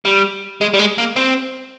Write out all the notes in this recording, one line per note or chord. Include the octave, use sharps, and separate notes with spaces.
G3
G#3
G3
G#3
A#3
C4